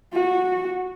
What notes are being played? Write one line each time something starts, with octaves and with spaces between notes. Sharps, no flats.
F#4